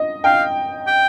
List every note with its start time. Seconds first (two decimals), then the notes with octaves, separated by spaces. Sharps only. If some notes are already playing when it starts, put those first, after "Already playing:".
Already playing: D#5
0.24 F5 G5
0.87 G5